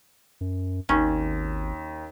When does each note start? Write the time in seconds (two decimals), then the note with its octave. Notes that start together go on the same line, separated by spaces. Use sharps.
0.41 F#2
0.89 G#1 D#2 C#4